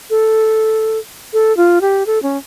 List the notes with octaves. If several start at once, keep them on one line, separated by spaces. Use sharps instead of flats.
A4
A4
F4
G4
A4
C#4